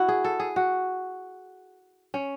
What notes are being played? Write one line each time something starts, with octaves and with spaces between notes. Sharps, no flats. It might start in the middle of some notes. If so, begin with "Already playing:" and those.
Already playing: E4 F#4
G#4
A4
G#4
F#4
C#4